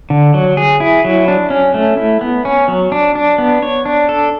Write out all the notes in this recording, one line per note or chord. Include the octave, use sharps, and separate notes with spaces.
D3
F#3
G#4
E4
F#3
D4
C#4
A3
E4
B3
C#4
F#3
D4
D4
B3
C#5
D4
A4